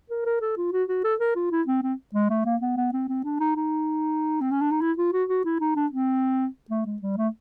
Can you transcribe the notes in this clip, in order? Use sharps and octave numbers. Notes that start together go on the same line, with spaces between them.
A#4
A#4
A4
F4
F#4
F#4
A4
A#4
F4
E4
C4
C4
G#3
A3
A#3
B3
B3
C4
C4
D4
D#4
D#4
C4
C#4
D4
D#4
E4
F4
F#4
F#4
E4
D#4
D4
C4
A3
G#3
G3
A3